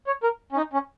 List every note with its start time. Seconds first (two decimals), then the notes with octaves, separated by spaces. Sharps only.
0.07 C#5
0.23 A#4
0.52 C#4
0.57 D#4
0.73 C#4